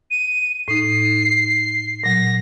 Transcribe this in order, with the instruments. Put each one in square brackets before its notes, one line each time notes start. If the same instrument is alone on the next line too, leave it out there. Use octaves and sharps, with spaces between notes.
[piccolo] D#7
[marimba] A2 D#4 [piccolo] C7
[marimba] A#2 F#3 [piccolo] A#6